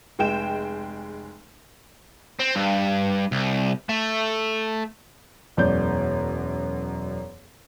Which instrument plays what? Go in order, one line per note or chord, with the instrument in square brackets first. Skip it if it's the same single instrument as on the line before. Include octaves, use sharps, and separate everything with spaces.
[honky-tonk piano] F1 G#3 G5 E7
[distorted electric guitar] C4
G2
C2
A3
[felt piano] E1 F#2 D5 G6